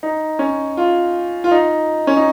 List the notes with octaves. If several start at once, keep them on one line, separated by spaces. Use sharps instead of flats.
D#4
C#4
F4
F4
D#4
C#4
D#4